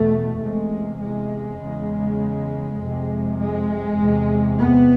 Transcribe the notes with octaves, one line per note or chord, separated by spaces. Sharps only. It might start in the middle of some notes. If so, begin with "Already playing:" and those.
Already playing: E2 B2 A3
E2 C3 G#3
G#3
E2 C#3
F2 C3
G#3
E2 C3
B3